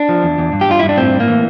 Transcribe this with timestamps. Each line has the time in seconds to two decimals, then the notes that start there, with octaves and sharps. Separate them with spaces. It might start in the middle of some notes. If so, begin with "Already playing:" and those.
Already playing: D4
0.09 F3
0.23 E2
0.38 E2
0.53 G2
0.61 G4
0.69 G2 F4
0.79 G2 E4
0.89 D4
0.98 A2 C4
1.14 A2
1.20 A#3
1.28 E3